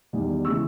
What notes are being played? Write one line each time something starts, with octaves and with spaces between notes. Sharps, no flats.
E2 D#3 G3
C#3 E3 G#3 C#6 E6